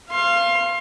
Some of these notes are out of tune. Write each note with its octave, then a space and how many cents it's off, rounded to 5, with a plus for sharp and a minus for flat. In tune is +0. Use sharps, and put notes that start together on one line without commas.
F5 -20 C6 +20